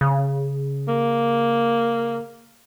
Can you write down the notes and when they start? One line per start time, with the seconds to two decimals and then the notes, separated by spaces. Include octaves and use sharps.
0.01 C#3
0.88 A#3